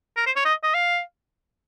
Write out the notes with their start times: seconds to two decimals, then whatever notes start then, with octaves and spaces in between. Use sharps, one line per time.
0.17 A#4
0.26 C5
0.36 C#5
0.45 D#5
0.63 D#5
0.74 F5